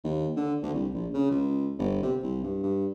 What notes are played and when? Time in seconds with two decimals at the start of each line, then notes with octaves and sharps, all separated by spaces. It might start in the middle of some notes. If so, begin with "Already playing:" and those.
0.04 D#2
0.36 D3
0.63 D2
0.74 C2
0.94 A#1
1.14 C#3
1.31 C#2
1.78 G1
2.03 C3
2.23 C2
2.43 G2
2.63 G2